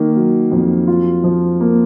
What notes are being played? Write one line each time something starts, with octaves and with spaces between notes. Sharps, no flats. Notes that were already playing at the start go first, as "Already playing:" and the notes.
Already playing: D#3 A#3
F#3
F2
F4
F3
A#3